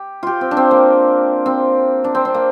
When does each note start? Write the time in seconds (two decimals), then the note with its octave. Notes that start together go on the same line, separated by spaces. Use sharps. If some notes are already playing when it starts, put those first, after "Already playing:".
Already playing: G4
0.23 F4 G4
0.41 C4
0.51 D4
0.57 C4
0.71 A#3
1.46 C4
2.04 D4
2.15 C4
2.25 C4
2.34 A#3